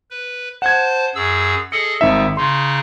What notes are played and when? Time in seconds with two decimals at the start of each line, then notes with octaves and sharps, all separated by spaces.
0.10 B4
0.62 C5 F#5 A5 G#6
1.15 F#2 G#4 E6
1.72 G#4 A4 D#5 C#7
2.01 G#1 G3 D#4 E5
2.37 C#3 D#4 C6